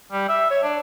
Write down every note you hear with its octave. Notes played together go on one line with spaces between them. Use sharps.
G3
E5
C#5
D4